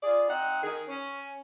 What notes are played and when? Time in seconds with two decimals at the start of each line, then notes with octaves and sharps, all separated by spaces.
0.03 F4 G#4 D5
0.28 C4 D#4 D#5 F#5
0.62 D#3 G#4
0.87 C#4